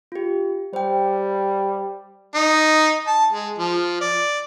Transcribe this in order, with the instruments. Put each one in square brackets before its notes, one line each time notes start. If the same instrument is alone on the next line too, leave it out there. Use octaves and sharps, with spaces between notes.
[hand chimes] F4 G4
[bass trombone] G3 [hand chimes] C5 G5
[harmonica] D#4
A5
G#3
F3
D5